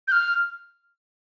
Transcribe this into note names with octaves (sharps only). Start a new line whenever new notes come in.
G6
F6